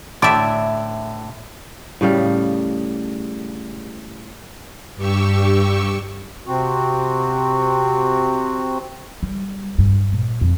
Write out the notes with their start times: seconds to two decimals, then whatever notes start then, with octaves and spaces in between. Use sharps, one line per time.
0.22 A2 D3 D5 E5
2.01 A2 C#3 G3 F5
4.95 G2 G4 C#6 E6
6.46 C3 C4 F#4
9.23 G3
9.78 G2
10.12 A#2
10.41 F2